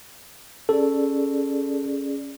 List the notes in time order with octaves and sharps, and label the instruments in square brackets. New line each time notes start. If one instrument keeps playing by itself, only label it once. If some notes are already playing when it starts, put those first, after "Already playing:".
[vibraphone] C#4 G#4 D5 [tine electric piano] A4